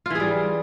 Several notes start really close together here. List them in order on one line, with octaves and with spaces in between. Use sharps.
F4 E3 G#4 G3